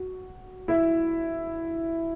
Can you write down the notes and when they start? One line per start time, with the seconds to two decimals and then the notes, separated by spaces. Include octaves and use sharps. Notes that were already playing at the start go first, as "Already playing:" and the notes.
Already playing: F#4
0.68 E4